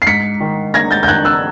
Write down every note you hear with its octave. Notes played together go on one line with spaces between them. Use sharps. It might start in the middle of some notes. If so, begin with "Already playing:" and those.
C7
G#2 B6 C#7
D#3
A#3 G#6 A#6
G6 A6
G6
D#3 F#6 G#6
E6 F#6